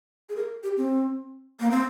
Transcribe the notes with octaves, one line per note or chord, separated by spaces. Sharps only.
G#4
A#4
G4
C4
A#3
C4